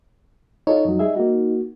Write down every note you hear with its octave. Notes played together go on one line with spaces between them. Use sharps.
D#4 F4 A4 C#5
F2 F#3
G3 G#4 E5
A#3 F#4